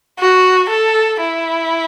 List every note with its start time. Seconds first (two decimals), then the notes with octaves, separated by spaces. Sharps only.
0.19 F#4
0.69 A4
1.20 E4